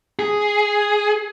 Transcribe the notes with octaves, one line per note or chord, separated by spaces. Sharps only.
G#4